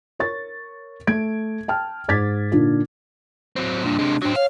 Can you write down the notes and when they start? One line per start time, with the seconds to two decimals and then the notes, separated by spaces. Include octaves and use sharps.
0.19 A#4 C#5 C#6 A6
1.07 A3 G#6 D7
1.68 G5 A5 F6
2.08 G#2 D6 G#6 A6 B6
2.52 A#2 D3 D4 D#4 F4
3.56 F#3 C4
3.83 G2 A#2 D4
3.99 C3 G#3
4.22 F#3 C4 D4
4.36 C#5 F5